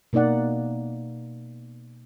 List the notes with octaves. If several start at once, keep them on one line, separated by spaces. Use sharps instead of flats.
B2 A#3 D#4 D5 F#5